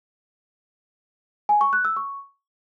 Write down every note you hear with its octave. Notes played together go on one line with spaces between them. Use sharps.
G#5
C#6
F#6
E6
C#6